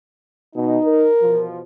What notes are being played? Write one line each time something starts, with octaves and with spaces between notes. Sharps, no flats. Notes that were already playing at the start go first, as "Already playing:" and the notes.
B2 D#4
A#4
E2 B2 F3